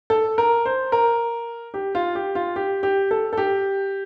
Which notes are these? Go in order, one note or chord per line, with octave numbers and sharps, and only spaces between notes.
A4
A#4
C5
A#4
G4
F4
G4
F4
G4
G4
A4
A4
G4